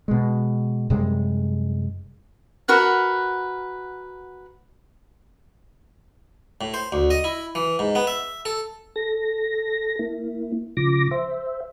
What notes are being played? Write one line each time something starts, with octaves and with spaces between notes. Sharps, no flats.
B2 G#3
F#2 C3 G3 G#3
F#4 A#4 B4 F#5
A2
C5
D2
D#5
E4
E3
G#2
B3
E5
A4
A4 A#6
A#3 E4
C#3 F3 D6 A#6
C5 E5